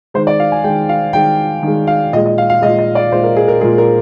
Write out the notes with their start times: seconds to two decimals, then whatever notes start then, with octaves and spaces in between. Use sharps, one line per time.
0.14 D#3 G#3 C5
0.27 D5
0.40 F5
0.52 G#5
0.64 G#3 G5
0.68 D#3
0.89 F5
1.13 D#3 G#3 G5
1.63 D#3 G#3
1.87 F5
2.13 A#2 D#5
2.17 G#3
2.26 D#5
2.38 F5
2.50 F5
2.62 G#3 D#5
2.66 A#2
2.79 D#5
2.95 D5
3.12 A#2 G#3 C5
3.23 A#4
3.36 G#4
3.48 A#4
3.61 G#3 G#4
3.64 A#2
3.78 A#4